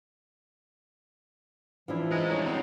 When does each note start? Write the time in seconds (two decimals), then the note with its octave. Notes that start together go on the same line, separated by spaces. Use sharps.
1.88 E3 F3 D4 E4
2.11 G#3 G#4 A#5
2.31 G3 D4 E4 C#5
2.46 D3 C4